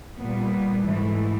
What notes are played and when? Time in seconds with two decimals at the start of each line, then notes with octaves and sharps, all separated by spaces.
0.17 A#2 G3 B3
0.83 G#2 E3 A3